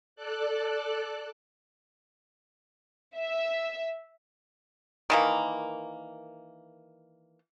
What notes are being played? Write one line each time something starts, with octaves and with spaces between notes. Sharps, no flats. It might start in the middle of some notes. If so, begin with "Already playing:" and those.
A4 D5 F#6
E5
D#3 E3 A#3